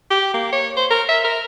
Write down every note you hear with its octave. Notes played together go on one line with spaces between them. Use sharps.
G4
A#3
C#5
C5
A#4
E5
A#4